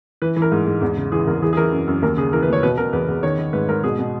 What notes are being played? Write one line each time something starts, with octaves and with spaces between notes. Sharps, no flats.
E3 B4
E3
A#4
G#2
G#2
E2
C#3
E3 G#4
E2 A#4
E3 G#4
G#4
E3 A#4
F#2
F#2
D#2 A#4
C#3 G#4
E3 A#4
B4
D#2
C#5
B2 B4
B2 A#4
E2 B4
E2
D#3 C#5
D#3
G#2 B4
G#2 A#4
B2 G#4
B2